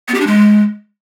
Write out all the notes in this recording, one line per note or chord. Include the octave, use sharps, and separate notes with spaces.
B3
G4
D4
G#3